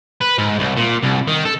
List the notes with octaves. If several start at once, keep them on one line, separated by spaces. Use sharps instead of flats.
B4
G#2
C2
A#2
C2
D#3
A4